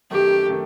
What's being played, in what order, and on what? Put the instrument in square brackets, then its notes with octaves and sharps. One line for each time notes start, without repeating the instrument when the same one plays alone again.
[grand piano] F#2 D#3 A3 [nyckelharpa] G4
[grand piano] D#3 A3